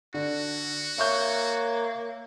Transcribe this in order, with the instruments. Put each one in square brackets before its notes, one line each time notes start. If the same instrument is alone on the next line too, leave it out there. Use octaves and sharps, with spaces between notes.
[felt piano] D3 [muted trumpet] F#4
[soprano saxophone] A#3 [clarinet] C#5 [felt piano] E5 C#6 G6